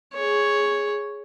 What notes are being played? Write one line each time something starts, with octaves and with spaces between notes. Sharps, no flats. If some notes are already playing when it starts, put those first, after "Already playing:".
G#4 C#5